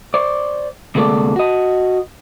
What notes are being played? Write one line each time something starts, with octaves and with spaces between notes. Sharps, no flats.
C5 D5
D2 C3 G#3 A#3 A4 D5
F#4 D#5